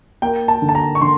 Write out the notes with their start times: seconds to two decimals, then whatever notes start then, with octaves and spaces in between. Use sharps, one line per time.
0.22 A#3 G5
0.48 A5
0.62 D3
0.69 A5
0.75 A#5
0.95 C#6
1.01 D3 C6